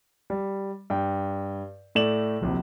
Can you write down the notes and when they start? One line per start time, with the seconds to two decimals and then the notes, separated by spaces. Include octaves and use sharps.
0.30 G3
0.90 G2 G5
1.95 A2 A3 D5 E7 F#7
2.41 D1 A#1 C3